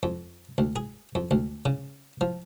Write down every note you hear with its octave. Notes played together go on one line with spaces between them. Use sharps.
F2
D2
G#4
F2
D2
C#3
F3